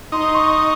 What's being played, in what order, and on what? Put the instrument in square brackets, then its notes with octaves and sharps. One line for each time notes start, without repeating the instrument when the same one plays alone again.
[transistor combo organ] D#4 [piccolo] C6
[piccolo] C#6